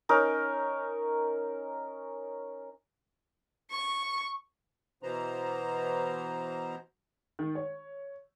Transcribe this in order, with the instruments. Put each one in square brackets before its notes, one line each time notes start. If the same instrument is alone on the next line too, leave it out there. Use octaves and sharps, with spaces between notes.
[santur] C#4 D#4 A#4
[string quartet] C#6
[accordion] B2 E3 B3 C5 A#5
[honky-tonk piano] D#3
C#5